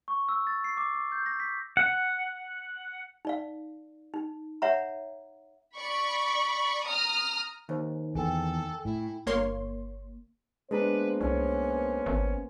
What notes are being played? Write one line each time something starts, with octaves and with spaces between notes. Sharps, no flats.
C#6
E6
A6
C7
D6
D6
G6
A#6
B6
F#5
D#4 D5 F5
D#4
C#5 E5 F#5 A#5
D5 B5 C#6
A#5 D#6 F6
D#2 D#4 C5
E2 A4 G5 G#5
A2 E4
G1 A#3 C#5 C6
G#3 A#3 B3 D4 B4 C5 A#5
C2 C#4
G#1